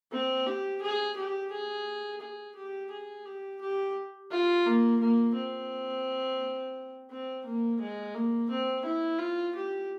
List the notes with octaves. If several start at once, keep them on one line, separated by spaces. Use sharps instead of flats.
C4
G4
G#4
G4
G#4
G#4
G4
G#4
G4
G4
F4
A#3
A#3
C4
C4
A#3
G#3
A#3
C4
E4
F4
G4